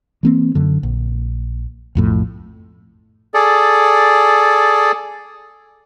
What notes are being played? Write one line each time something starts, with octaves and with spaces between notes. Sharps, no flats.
E3 A#3 C4
F#2 D3
A#1
B1 F2 A2
G#4 A4 D5